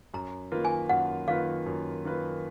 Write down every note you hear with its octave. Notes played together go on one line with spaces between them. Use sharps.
F#2 A#5
D#3 A#3 F4 B4
G#5
F#2 F#5
D#3 A#3 F4 B4 F5
F#2
D#3 A#3 F4 B4